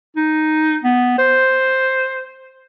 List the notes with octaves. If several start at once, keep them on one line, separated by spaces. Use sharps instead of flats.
D#4
B3
C5